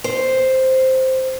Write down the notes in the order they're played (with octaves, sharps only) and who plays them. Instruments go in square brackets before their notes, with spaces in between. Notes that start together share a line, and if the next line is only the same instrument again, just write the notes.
[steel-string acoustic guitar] C5